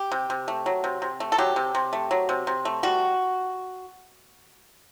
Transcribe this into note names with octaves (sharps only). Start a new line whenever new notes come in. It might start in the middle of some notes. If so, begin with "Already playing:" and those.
Already playing: G4
C3
C3
A3
F#3
C3
C3
A3
A4
F#3 G4
C3
C3
A3
F#3
C3
C3
A3
G3 F#4